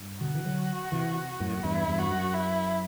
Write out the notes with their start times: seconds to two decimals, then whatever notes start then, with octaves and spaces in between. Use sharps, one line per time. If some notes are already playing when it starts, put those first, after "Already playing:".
Already playing: G2
0.21 B2 D3 F#4
0.35 E3
0.45 D3 F#3
0.92 C3 E3
1.40 F#2 A2
1.58 A2
1.63 E2 G2 E4
1.87 E2 G2
1.99 F#4
2.10 F#2
2.34 E4